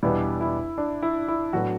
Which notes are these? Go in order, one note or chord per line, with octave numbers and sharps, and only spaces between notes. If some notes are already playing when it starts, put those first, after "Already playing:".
E2 B2 G3 B3 D4 E4
E4
D4
E4
E4
A2 F#3 B3 D4 F#4